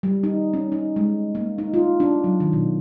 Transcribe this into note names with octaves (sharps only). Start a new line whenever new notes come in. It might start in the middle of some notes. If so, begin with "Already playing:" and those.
G3
D#4
C#4
D#4
G#3
A#3
D#4
F4
D4
F#3
D#3
B2